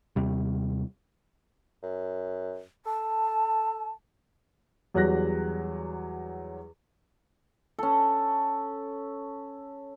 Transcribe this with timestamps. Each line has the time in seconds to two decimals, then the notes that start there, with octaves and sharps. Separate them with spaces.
0.16 D#2 C3 G3
1.82 F#2
2.86 A4 A5
4.94 E2 F#3 G3 F#6 A#6
7.79 C#4 A4